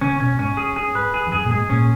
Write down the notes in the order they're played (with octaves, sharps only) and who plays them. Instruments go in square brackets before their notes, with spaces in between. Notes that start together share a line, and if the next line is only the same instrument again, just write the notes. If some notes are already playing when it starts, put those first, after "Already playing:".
[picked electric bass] C#3 [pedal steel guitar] C#4
[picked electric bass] B2 [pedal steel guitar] C#4
[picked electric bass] G#2 [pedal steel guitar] C#4
[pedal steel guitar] G#4
G#4
B4
G#4
[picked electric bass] E2
[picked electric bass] F#2 [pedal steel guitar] G#4
[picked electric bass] A#2
[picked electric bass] G#2 [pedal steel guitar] G#4
[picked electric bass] A#2 [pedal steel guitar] C#4